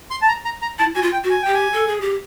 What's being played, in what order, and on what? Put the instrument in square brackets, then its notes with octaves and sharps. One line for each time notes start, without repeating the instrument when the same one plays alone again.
[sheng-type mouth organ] C6
A5
A#5
A#5
A#5
[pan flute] E4 [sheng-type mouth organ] A5
[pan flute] F#4 [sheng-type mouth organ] G#5
[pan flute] F4
[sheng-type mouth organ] G5
[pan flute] F#4
[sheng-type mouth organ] G#5
[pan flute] G4 [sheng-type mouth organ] G5
[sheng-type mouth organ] G#5
[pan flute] A4
G#4
G4